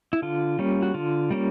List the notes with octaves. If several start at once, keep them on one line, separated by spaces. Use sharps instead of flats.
E4
D3 F4
G3 A#3 C#4
F#4
D3 F4
G3 A#3 C#4